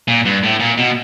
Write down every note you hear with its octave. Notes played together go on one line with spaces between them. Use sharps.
A#2
G2
A2
A#2
B2